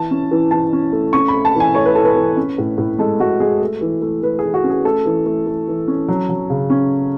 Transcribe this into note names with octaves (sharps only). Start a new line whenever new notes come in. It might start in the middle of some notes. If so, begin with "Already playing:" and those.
Already playing: E3 A5
C#4
E3
E3 A5
C#4
A3
C#4 C#6
B5
A3
A5
E3
G#5
A3 C#5
B4
E3 A4
B4
E3
C#4
A2
A2
G#3 A4
G#3 F#4
G#3 G#4
A3
E3
A3
A3 B4
E3 G#4
F#4
C#4
G#4
A3 A4
E3
A3
A3
E3
C#4
F#3
F#3
C#3
C#4